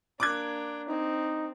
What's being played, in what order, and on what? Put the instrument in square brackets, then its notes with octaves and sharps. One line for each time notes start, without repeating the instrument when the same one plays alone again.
[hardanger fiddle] A#3 D4 [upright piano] D6 F#6 G#6
[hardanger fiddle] C4 [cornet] D#4